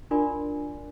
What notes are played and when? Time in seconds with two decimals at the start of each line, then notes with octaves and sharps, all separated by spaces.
0.11 D4 F4 A#4 D5 G#5 C6